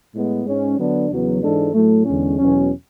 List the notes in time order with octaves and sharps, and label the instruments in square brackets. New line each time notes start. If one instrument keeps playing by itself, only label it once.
[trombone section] A2 G#3 B3
G#2 G#3 C#4
D3 F#3 B3 D4
E2 C#3 F#3 B3
G#2 E3 G#3 D4 A4
A2 F#3 A3
E2 D3 G#3 C#4
E2 B2 F#3 C#4